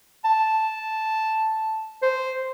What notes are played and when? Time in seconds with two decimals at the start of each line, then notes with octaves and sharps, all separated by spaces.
0.25 A5
2.03 C5